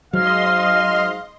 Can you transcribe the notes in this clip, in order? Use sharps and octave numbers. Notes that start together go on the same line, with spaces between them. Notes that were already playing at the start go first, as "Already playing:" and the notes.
G#2 F#3 D#5 F5 C6 F6